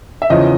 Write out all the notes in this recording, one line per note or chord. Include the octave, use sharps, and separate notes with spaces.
E5
E2 C#3 F3 D#5